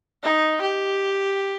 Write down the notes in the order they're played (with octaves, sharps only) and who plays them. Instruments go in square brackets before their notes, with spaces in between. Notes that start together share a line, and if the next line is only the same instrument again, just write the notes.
[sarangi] D#4
G4